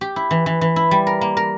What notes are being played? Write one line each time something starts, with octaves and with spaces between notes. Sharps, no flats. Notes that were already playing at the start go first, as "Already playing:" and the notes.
G4
E4
E3
E3
E3
E4
G3
A#4
A#3
A#4